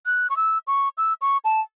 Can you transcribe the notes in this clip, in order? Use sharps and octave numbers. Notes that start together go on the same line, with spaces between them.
F#6
C#6
E6
C#6
E6
C#6
A5